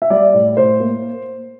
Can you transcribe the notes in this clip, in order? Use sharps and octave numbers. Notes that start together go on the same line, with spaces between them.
E5
G3 D5
A2
A2 C5
A#3